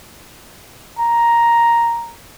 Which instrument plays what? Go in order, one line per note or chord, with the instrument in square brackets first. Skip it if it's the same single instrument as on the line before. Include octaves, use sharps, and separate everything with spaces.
[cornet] A#5